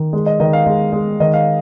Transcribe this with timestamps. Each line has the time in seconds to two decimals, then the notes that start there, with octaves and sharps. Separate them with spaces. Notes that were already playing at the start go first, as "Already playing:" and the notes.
Already playing: D#3
0.13 G#3
0.26 D#5
0.40 D#3 D#5
0.53 F5
0.66 G#3
0.93 G#3
1.20 D#3 D#5
1.34 F5